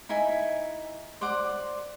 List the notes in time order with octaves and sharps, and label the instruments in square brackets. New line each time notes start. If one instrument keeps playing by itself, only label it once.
[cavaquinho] D#4 E4 E5 G#5
C5 D5 F#5 D6